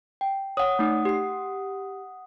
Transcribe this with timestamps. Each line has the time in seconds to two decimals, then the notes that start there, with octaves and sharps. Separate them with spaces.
0.21 G5
0.57 C#5 F#5 D#6
0.79 A3 D#4
1.05 G4 C7